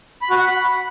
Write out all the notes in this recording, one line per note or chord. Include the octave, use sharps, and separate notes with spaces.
B5
F#4
F#5
B5